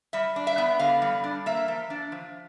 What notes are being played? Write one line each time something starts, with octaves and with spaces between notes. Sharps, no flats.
G3 E5
D4
E5
B3
D3 F5
G3
D4
A#3 E5
F3
D4
F3